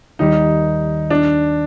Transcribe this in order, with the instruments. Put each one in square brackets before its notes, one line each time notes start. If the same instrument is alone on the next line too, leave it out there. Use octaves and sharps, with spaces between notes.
[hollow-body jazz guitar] D#2 D#3 G3 [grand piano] D#4
[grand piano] D4